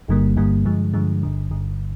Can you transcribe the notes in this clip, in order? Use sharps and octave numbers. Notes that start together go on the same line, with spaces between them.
G1 G2 D3 G3 A#3
G1 G2 D3 G3 A#3
G2 D3 F3 G#3
G2 D3 F3 G#3
G1 G2 D3
G1 G2 D3